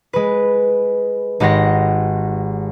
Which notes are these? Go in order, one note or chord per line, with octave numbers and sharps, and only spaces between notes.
G#3 B4
G#1 G#3 G4 F#5 C6 A#6